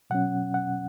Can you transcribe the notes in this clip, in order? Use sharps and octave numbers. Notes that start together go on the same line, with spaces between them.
B2 F#3 C#4 F#5
F#5